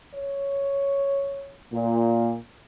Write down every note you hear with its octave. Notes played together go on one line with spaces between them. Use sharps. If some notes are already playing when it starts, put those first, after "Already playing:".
C#5
A#2